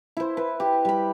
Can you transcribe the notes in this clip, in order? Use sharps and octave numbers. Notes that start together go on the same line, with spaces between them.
E4 C5
B4
G4
G3 B5